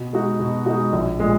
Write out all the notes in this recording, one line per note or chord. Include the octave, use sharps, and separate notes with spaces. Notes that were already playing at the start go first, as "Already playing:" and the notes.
Already playing: B2
G#3 D#4 F#4
B2
G#3 D#4 F#4
A#1
A#2 G#3